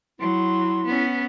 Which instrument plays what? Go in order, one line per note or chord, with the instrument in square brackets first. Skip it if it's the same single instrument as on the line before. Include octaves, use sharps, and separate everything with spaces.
[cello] F#3 [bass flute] E4 [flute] C6
[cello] B3 C#4